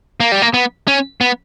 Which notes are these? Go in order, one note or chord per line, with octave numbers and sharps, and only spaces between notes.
A#3
G3
A#3
B3
C#4
B3